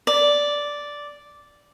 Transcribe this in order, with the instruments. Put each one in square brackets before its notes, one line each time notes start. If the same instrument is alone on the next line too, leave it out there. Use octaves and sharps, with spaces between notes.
[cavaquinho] D5